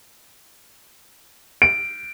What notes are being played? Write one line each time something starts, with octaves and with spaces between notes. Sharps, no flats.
D7